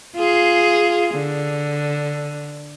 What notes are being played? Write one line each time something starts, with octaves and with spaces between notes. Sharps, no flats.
F4 G#4
D3